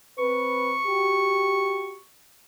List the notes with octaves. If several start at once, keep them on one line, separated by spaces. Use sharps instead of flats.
C4 B4 C#6
F#4 G4